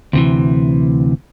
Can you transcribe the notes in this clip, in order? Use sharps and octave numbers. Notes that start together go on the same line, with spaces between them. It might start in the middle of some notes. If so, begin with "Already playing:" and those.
D2 C3 E3